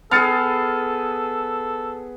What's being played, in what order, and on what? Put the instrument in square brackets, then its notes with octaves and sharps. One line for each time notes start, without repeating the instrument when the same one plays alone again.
[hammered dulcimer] B3 G#4 [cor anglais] A4 [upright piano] F6 A6 C#7